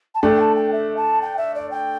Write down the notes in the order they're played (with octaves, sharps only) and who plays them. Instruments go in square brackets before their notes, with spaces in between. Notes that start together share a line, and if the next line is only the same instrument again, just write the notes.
[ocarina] A5
[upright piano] A3 D4 [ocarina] G5
[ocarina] A5
G5
E5
A5
G5
E5
D5
G5